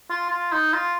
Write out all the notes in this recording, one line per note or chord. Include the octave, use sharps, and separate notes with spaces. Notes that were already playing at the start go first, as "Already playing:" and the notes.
F4
F4
D#4
F4